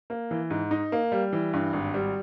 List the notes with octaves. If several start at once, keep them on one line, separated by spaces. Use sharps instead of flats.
A#3
E3
G#2
D#4
A#3
G3
E3
G2
G#1
G3